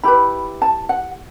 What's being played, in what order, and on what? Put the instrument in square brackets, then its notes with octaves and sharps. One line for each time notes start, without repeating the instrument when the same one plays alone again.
[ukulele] E4 G4 B4 B5
A5
F#5